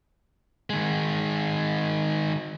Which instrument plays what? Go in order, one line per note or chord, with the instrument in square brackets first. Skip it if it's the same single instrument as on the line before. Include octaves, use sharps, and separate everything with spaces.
[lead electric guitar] D#3 G#3